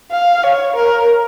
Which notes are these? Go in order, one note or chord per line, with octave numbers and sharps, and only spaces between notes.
F5
C#5
A#4